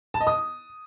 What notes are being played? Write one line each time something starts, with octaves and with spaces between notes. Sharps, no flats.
A5
D#5
D#6